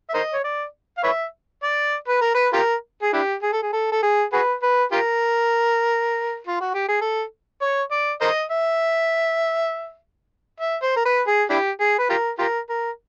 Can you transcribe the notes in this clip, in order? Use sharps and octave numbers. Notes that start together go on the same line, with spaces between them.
E5
A#4 C5 D#5
C#5
D5
F5
B4 C#5 E5
D5
B4
A#4
B4
F4 G4 A#4
G#4
D4 E4 G4
G#4
A4
G#4
A4
A4
G#4
F#4 G#4 B4
B4
F4 G4 A#4
F4
F#4
G4
G#4
A4
C#5
D5
A#4 C5 D#5
E5
E5
C5
A#4
B4
G#4
D4 E4 G4
G#4
B4
F4 G4 A#4
F4 G4 A#4
A#4